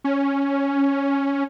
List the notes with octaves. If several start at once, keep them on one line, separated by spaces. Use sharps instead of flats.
C#4